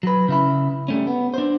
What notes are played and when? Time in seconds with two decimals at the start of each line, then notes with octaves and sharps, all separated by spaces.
0.03 F#3 B4
0.28 C#3 E4 B5
0.88 G3 A3 C#4
1.07 B3
1.34 D4 C5